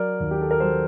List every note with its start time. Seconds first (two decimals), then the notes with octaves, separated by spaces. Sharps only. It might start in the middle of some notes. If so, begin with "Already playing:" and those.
Already playing: F#3 A#4 D5
0.20 D#2
0.31 G4
0.41 A4
0.51 A#4
0.60 F#3 A4 C5